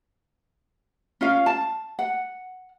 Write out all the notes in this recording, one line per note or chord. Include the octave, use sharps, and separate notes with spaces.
C#4 F4 F5
A5
F#5